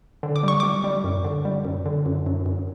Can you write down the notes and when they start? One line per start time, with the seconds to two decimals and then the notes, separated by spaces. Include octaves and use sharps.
0.23 D3
0.36 D6
0.43 G3 C#6
0.60 G3 D6
0.84 G3
1.04 F#2
1.25 D3
1.45 G3
1.65 F#2
1.86 D3
2.06 F#2
2.26 F#2
2.46 F#2